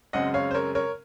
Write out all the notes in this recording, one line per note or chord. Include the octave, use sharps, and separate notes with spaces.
F#2 C#3 G#3 C4 D#5 F#5
C#5 F5
C5
A#4 C#5
A#4 C#5